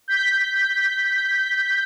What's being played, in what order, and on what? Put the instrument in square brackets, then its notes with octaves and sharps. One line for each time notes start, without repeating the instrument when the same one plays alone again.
[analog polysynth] G6 B6